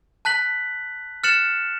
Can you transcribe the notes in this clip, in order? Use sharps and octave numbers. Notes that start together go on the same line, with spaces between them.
A5 F#6 B6 F#7
F6 F#6 A6 C#7 E7 F#7